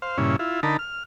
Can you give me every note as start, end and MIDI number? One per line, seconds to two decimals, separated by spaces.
0.02 0.18 72
0.02 0.18 77
0.18 0.36 43
0.18 0.36 46
0.18 0.36 49
0.18 0.36 61
0.18 0.36 64
0.39 0.60 64
0.39 0.60 65
0.63 0.77 50
0.63 0.77 63
0.63 0.77 70
0.63 0.77 81
0.63 0.77 83
0.79 1.03 89